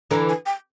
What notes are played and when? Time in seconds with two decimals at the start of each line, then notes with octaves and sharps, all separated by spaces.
0.11 D3 E3 A#5
0.29 G#5
0.46 G5